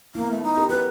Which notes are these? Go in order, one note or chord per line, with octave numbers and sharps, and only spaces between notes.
A#3 B3 E4
A3
D#4
C#4 G4 A#4
F#4 A#4 B4